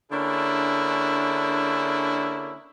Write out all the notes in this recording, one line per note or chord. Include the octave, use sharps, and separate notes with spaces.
D3 A#3 C#4 D4 E4 G#4